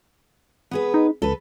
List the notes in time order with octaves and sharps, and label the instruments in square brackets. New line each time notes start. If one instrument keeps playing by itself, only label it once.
[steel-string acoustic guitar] B3 G#4 B4
[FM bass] D#4
[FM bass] C#2 [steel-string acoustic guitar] A4 B4